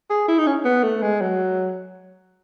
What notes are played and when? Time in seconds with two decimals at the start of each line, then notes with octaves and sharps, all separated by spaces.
0.10 G#4
0.28 E4
0.38 D#4
0.47 C#4
0.65 B3
0.83 A3
1.02 G#3
1.21 F#3